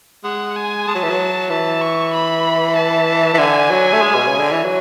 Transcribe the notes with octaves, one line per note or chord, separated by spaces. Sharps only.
G#3 F#5
G#5
G#3 A5
F#3
E3
F#3
E3 A5
C#6
B5
A5
E3
D3 G#5
F#3
A3
G#3
B2
C#3
D3
E3
F#3